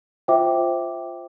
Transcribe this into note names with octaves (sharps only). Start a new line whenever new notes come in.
F4 C5 E5 G5 D6